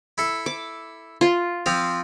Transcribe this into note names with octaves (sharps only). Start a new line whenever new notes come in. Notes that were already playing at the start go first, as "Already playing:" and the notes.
E4 A4
D6
F4
F3 C4 F4 F5